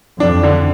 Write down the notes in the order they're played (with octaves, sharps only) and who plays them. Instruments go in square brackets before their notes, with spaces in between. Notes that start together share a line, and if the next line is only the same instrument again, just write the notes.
[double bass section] F2 [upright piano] D4
[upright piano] D3